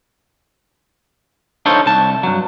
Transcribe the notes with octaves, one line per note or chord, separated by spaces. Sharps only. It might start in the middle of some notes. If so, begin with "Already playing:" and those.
D4 D#4 F4 A4 C5 C#5
C2 A5
G2 F#3